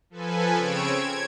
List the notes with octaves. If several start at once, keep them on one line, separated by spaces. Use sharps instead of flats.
F3 A4 B4 G#5
C#3 C4 C#5 E6 G#6 D7
G#6